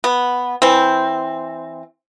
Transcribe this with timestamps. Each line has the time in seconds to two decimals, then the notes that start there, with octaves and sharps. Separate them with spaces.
0.04 B3
0.62 E3 C4